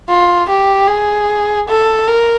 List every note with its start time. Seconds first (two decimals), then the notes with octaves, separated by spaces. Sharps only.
0.09 F4
0.49 G4
0.88 G#4
1.68 A4
2.07 A#4